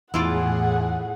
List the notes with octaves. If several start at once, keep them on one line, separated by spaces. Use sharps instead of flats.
E2 A2 E4 F4 G#4 D5 F#5